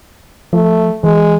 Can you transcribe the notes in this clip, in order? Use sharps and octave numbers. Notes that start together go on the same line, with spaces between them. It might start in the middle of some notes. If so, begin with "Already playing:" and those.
F3 A3
E3 G#3